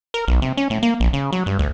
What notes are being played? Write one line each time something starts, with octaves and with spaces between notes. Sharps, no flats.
A#4
B1
C3
C#4
A2
A#3
A#1
C#3
F#3
G2
D2